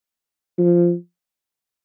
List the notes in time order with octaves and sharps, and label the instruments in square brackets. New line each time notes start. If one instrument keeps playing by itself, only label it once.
[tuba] F3